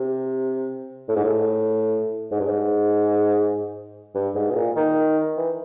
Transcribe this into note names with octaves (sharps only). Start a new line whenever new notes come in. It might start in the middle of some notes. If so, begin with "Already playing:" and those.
Already playing: C3
A2
G#2
A2
G#2
G2
G#2
G2
G#2
B2
A#2
D#3
E3